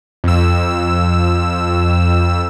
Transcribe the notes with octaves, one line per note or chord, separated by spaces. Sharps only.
F2 E6